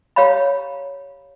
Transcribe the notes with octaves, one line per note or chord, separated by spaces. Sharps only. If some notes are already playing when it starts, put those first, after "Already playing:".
G4 C#5 F5 A#5 B5